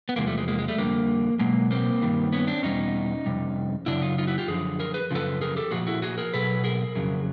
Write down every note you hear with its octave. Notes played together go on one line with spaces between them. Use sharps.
B3
E2 C3 F3 G#3 A#3
G3 A3
G#3
G#3 A#3
G#3
G3 A3
F2 D3 G3 A#3
B2 F#3 G#3 A#3
A#3 C4
G2 D#3 G3
B3 C#4
C4 D4
E2 B2 G3 C#4 D#4
F2 C3 G3
F#2 C#3 F#3 D4 E4
D#4 F4
D#4 F4
E4 F#4
F4 G4
F#2 D3 F3 G#4
G#4 A#4
B4
F#2 C#3 F3 A4 B4
G#4 A#4
G4 A4
A#2 F3 F#4 G#4
E4 F#4
F#4 G#4
G#4 A#4
B2 F#3 A4 B4
G#4 A#4
F2 C#3 F#3